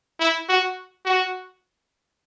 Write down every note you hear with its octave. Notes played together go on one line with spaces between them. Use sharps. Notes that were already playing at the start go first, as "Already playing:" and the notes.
E4
F#4
F#4